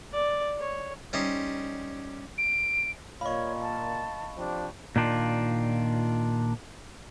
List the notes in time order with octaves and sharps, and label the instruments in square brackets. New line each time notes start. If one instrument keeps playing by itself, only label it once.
[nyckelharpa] D5
C#5
[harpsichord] G3 C#4 D#4 C5 D#5
[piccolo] D7
[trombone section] A#2 [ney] C#5 [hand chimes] D#5 F5 [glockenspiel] B5 C#6
[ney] A5
[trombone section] F3 C4 D4 [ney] G4
[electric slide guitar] A#2 D#3 D4 F4